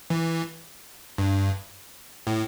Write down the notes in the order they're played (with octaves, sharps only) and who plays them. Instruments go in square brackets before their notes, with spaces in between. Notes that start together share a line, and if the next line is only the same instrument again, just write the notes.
[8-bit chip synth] E3
G2
A2